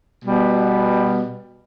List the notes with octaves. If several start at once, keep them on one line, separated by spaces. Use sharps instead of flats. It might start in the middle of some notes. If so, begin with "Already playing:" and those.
B2 G3 B3